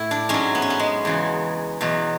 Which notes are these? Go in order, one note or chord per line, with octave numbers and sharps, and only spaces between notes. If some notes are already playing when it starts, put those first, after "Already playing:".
Already playing: A2 E4
D4
G#2 F#3 C#4
B3
C#4
B3
G#3
E2 C#3 F#3
E2 B2 F#3